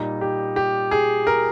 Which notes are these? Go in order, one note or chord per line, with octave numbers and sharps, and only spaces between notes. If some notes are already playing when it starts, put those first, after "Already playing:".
Already playing: A#2 G3 D#4
G4
G4
G#4
A#4